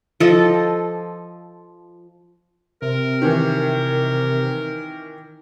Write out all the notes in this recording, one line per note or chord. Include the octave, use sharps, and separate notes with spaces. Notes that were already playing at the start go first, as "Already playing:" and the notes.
F3 A4 D#5
C3 A#4
D#3 E3